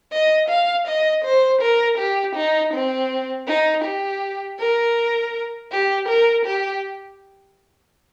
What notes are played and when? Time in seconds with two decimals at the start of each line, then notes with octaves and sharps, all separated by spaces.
0.12 D#5
0.49 F5
0.87 D#5
1.25 C5
1.61 A#4
1.98 G4
2.36 D#4
2.74 C4
3.48 D#4
3.84 G4
4.60 A#4
5.72 G4
6.09 A#4
6.45 G4